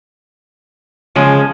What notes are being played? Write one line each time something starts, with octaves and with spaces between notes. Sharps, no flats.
C#3 F3 G#3